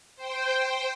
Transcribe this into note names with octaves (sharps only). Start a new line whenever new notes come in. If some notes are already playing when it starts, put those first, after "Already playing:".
C5 G5